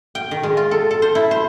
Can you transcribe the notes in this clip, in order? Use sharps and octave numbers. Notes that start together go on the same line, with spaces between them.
G5
D#3
G#3
F4
A4
A4
C5
E4
C5